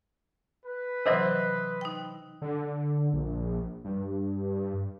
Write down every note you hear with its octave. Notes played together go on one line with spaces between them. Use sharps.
B4
C3 E3 F#3 C5 D#5 E5
D#4 G5
D3
A#1
G2